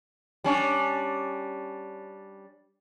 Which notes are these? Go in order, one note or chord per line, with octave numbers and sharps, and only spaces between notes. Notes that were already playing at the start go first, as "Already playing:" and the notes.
G3 C#4 D4